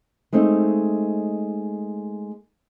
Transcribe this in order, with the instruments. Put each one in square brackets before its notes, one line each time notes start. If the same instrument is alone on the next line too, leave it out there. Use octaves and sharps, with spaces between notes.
[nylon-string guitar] G#3 A3 C4 D#4